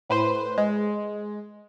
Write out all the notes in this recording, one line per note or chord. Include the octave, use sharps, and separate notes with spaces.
A2 B4 C5 C6
G#3